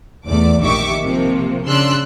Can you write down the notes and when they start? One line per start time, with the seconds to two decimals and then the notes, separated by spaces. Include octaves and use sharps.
0.27 E2 A3 D5 D6
0.62 A#1 D#3 G4 E5 C#6 D6
1.05 C3 F3 A#3
1.67 C#3 D4 C6 E6 F#6